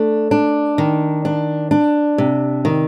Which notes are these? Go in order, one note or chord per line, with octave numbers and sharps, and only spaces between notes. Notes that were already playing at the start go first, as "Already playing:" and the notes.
Already playing: A3 D4
D4
D#3
D4
D4
C3
D#3